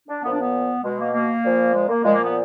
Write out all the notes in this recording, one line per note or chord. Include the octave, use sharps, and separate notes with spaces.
D4
A#2 F3 B3
D4
B3
B2 G#3
A#3
A#3
A#2 F3
G#3
A#3
A#2 F3 G#3
A#3
B3